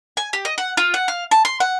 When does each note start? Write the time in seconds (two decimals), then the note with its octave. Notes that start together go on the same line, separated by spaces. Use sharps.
0.17 G#5
0.33 G4
0.45 D#5
0.58 F#5
0.77 F4
0.94 F#5
1.08 F5
1.31 A5
1.45 C6
1.60 F#5